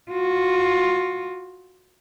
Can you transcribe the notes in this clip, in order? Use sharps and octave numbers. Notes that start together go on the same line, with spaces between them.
F4 F#4